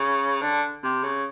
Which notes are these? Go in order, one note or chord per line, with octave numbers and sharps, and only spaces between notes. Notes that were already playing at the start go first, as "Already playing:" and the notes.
Already playing: C#3
D3
C3
C#3